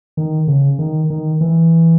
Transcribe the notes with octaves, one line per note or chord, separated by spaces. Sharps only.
D#3
C#3
D#3
D#3
E3